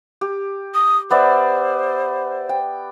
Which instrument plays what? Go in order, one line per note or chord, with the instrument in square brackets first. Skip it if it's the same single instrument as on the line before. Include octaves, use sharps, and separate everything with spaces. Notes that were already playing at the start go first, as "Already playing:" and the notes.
[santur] G4
[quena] D#6
[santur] B3 D5 E5 [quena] C5
[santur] G5